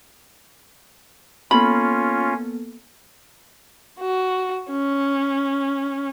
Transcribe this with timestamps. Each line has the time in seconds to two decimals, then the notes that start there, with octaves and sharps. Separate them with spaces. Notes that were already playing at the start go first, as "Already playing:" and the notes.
1.51 A#3 B3 C#4 F4 A4 B5
4.00 F#4
4.71 C#4